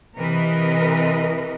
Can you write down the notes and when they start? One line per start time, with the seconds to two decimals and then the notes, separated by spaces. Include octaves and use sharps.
0.17 C3 E3 A#4 B4 D#5